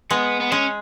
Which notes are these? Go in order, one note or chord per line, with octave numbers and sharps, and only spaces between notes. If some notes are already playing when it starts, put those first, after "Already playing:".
G#3 B3
B3
G#3 C#4